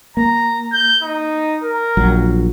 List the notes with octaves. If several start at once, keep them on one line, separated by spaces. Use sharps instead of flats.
A#3 A#5
G6
D#4
A#4
A#1 F#3